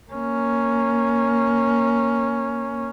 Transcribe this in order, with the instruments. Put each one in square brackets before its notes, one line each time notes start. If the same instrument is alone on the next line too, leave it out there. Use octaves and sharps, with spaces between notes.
[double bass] A#3 C#4